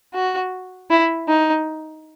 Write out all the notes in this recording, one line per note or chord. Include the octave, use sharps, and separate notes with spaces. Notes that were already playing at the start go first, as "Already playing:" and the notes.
F#4
E4
D#4